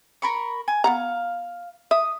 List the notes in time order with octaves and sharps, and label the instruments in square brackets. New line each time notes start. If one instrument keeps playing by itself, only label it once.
[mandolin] A#4 B5 C#6
G#5
[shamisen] B3 F#5 A#5 [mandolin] F5
[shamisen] E5 [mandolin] D#6